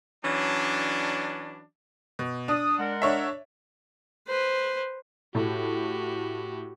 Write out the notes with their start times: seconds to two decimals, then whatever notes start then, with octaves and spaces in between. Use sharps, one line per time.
0.24 E3 F#3 C#4 D4
2.19 B2
2.48 D4 D#6
2.79 G#3 A#4 F#5
3.02 D4 C#5 E5
4.28 B4 C5
5.35 A2 F#4 G4